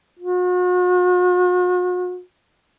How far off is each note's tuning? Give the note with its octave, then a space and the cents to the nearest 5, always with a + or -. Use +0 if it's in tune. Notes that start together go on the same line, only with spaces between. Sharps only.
F#4 -45